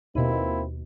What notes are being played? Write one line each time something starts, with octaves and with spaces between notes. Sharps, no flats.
D#2 B2 A#3 C4 E4